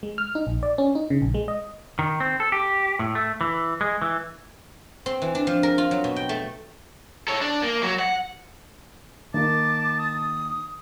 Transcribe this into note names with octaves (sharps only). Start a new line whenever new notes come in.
G#3
F6
D#4
A#1
D5
C#4
D#4
C#3
A#1
G#3
D#5
D#3
C4
A4
G4
A2
A3
E3
G#3
E3
C4
E3
D4
F3
A#4
F4
F#3
B2
G5
A3
A4 C#5
D4
A#3
F#3
F#5
D#3 A#3 A5 D6
D#6